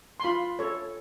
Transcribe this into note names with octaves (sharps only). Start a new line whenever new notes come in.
C6
F4 B5
A4 C#5